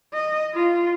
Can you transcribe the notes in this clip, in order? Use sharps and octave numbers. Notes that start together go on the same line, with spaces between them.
D#5
F4